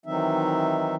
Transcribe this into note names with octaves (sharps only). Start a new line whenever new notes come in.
D#3 E3 F#3 C4 D#4 E5